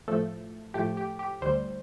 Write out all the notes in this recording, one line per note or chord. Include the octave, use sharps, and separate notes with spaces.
A2 F3 A3 A4
A2 F3 A3 G4
G4
G4
D2 D3 G3 C5